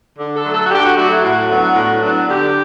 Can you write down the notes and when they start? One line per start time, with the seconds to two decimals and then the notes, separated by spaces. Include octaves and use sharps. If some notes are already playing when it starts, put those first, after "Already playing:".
0.18 D3
0.36 A4
0.44 F#3 A3
0.53 A4
0.64 F#4
0.71 D3 G4
0.83 F#4
0.96 F#3 A3 F#4
1.10 E4
1.22 A2 F#4
1.49 F#3 B3 D4
1.75 A2
2.02 F#3 B3 D4
2.27 D3 G4